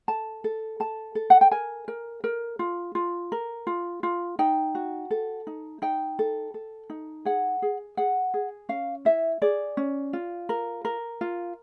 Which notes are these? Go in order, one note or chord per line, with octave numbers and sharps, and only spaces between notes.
A4 A5
A4
A4 A5
A4
F#5
G5
A#4 G#5
A#4
A#4
F4
F4
A#4
F4
F4
D#4 G5
F#4
A4
D#4
D#4 G5
A4
A4
D#4
G#4 F#5
G#4
G#4 F#5
G#4
C#4 F5
E4 E5
G#4 D5
C#4
F4
A#4
A#4
F4